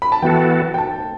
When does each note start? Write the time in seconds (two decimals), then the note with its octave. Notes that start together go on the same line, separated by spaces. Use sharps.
0.02 B5
0.12 A5
0.22 E3 B3 F#4 A4 G5
0.74 G5
0.78 A5